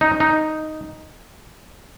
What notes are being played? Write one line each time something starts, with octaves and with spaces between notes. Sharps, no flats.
D#4
D#4